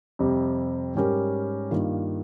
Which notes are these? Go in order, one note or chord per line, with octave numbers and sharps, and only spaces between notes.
F2 C3 G3
G#2 G3 C#4 G4 A#4
G2 D#3 A#3 F4